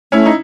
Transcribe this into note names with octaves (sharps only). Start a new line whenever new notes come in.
A3 C#4 E4
D#4